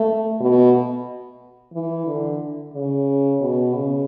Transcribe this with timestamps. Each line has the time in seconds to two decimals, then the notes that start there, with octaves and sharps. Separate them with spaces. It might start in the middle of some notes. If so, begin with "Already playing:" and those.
Already playing: A3
0.40 B2
1.73 E3
2.07 D3
2.74 C#3
3.41 B2
3.74 C#3